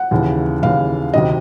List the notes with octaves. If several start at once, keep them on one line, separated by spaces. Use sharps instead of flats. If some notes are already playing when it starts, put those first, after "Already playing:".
Already playing: F#5
D#2 C#3 E3
D#2 C#3 E3 F5
D2 C3 D#3 D#5